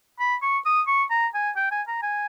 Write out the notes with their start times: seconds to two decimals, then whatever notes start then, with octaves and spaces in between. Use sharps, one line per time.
0.19 B5
0.42 C#6
0.66 D#6
0.87 C#6
1.11 A#5
1.34 G#5
1.56 G5
1.71 G#5
1.88 A#5
2.03 G#5